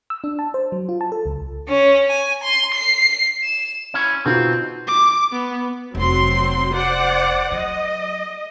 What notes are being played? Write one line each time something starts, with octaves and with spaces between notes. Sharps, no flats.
E6
D4
A5
C5
F#3
F4
A5
A4
C#2
C#4
G#5
C6
C7
E7
C#4 E4
B2 C4 D#4 F4
D6
B3
F1 F#3 C4 C6
C5 D5 F#5
F#3 D#5